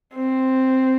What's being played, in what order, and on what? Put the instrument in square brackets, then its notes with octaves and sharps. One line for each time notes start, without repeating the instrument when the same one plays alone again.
[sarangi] C4